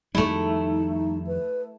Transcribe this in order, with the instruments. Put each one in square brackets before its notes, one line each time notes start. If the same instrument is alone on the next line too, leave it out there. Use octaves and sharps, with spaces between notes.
[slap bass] F2 D#3 G3 [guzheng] A3 E4 [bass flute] D#4
[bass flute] B4